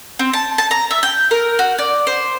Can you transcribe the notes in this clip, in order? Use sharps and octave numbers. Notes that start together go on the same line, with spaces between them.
C4
A5
A5
A#5
E5
G5
A#4
F#4
D5
C5